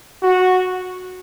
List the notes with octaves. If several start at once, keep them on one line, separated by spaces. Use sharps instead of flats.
F#4